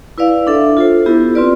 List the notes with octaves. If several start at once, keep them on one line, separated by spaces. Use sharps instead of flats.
E4 B4 D5 F5
D4 A4 E5
F4 A4 C5
B3 E4 G4
C4 F4 B4 D5